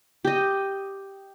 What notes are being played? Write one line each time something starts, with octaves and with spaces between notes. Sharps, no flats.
G4 D#5